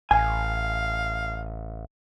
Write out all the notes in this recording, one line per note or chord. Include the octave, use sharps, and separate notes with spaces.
A1 F5 G#5